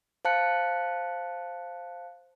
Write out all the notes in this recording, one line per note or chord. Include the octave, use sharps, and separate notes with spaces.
C5 F5 A5 F#6 C#7